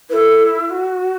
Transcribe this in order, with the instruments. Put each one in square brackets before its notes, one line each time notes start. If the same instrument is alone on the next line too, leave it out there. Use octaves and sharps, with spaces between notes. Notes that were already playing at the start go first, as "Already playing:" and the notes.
[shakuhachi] E4 [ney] A4 B4
[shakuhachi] F#4